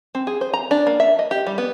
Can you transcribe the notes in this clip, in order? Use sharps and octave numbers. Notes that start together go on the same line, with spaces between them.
C4
G#4
C5
A#5
D4
A#3
E5
D#5
G4
G3
B3